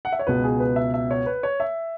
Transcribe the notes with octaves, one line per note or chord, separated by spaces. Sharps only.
F#5
E5
C#5
C#2 B2 B3 B4
G#4
B4
E5
E5
C#5
B4
C#5
E5